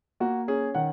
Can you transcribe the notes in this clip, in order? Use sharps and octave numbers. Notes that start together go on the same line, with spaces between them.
A#3 F#4
C#4 G#4
D#3 F#5